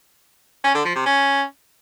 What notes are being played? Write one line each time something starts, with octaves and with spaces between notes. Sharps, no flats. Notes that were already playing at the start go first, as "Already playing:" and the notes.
C#4
D3
F3
C3
C#4